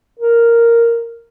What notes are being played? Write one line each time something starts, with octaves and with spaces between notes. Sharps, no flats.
A#4